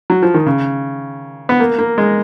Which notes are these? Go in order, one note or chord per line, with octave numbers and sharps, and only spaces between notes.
F#3
F3
D#3
C#3
B3
A#3
A#3
G#3